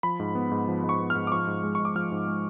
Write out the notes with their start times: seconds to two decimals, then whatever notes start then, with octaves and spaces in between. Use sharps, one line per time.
0.03 F3 B5
0.20 G#2
0.35 B3
0.52 G#2
0.68 F3
0.84 G#2
0.89 C#6
1.00 B3
1.10 F6
1.15 G#2
1.27 D6
1.32 F3 C#6
1.47 G#2
1.63 G#3
1.75 G#2 C#6
1.85 D6
1.96 F3 F6
2.12 G#2
2.28 G#3